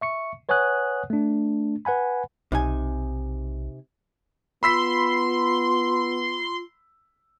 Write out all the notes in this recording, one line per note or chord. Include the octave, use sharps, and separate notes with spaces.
E5 C#6 C#7
B4 C#5 F#5 G#5 D#6 F#6
A3 D4
B4 F#5 G#5 B5
B1 C3 D#4 G#5
B3 F4 B5 C6 E6 B6